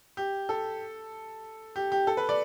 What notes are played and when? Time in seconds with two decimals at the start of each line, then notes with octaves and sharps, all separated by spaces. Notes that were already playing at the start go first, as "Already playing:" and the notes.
0.17 G4
0.49 A4
1.76 G4
1.92 G4
2.07 A4
2.17 B4
2.29 D5